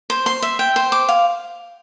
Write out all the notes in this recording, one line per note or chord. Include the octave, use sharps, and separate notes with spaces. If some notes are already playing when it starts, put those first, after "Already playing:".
C5
C6
E5
G5
C5
D6
F5